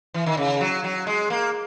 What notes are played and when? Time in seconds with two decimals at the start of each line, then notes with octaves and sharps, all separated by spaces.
0.14 E3
0.26 D#3
0.37 C#3
0.61 F#3
0.84 F#3
1.07 G#3
1.30 A#3